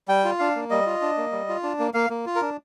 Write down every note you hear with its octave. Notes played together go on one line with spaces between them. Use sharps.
G3 G5
F4
D4 F5
A#3
G3 D#5
F4
D4
A#3
G3
F4
D4
A#3
A#3 F5
A#3
F4
A#4
D4